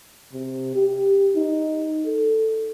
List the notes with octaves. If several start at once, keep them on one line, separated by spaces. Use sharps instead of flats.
C3
G4
D#4
A4